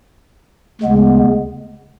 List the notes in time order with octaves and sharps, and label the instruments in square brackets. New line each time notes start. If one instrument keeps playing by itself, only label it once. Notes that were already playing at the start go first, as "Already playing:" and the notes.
[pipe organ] D2 C#3 G#3 B3